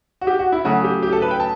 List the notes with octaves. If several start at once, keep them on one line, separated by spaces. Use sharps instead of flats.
F#4
G4
F#4
E4
C#3 F#3 A3 F#4
G4
G4
A4
B4
G5
A5